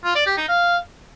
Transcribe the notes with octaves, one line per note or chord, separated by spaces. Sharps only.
F4
D5
G4
D#4
F5